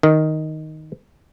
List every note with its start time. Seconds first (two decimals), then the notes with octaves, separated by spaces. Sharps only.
0.03 D#3